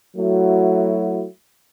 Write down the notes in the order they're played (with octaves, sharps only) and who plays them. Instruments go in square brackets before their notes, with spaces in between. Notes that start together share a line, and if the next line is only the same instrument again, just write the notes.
[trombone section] F#3 A3 E4 F#4